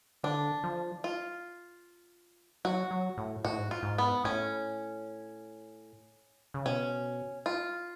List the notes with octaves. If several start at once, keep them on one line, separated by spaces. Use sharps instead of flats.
D3 D4
F3
F4
F#3 F#4
F#3
A2
A2 F#4
G#2
F4
G#2
B3
A2 C#4
C#3
B2 C#4
F4